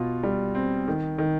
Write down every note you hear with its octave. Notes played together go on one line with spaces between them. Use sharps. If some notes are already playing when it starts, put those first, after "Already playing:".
Already playing: B2 F4
G3
C4
D#3
D#3